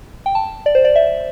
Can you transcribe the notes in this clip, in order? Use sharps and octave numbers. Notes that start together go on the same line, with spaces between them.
G5
A5
D5
C5
D5
E5